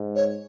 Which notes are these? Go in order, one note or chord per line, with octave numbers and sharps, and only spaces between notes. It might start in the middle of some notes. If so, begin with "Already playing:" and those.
Already playing: G#2
C#5